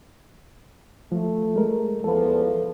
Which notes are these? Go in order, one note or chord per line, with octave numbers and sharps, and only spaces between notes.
F3 A3
G#3 A#4
E2 F3 A4 B4